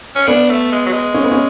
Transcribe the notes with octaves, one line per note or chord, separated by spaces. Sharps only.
C#4
B3 D4
A3
G#3
F#3
G#3
C#4
B3
C#4